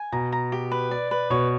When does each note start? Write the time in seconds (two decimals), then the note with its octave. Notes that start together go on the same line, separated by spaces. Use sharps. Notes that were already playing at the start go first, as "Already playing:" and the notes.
Already playing: G#5
0.12 B2 A#5
0.32 A#5
0.52 G4
0.71 B4
0.91 D5
1.11 B4
1.30 B2 C#5